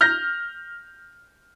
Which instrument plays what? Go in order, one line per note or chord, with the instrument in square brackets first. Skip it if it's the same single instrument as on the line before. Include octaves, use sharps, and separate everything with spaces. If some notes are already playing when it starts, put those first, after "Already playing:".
[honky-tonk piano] F6 G6 A#6